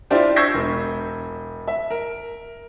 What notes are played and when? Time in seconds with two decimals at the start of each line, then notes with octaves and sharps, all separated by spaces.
0.11 D4 E4 F4 G4 C5 D5
0.36 C#6 E6 G6 G#6 A#6 C7
0.55 E1
1.68 E5
1.90 A#4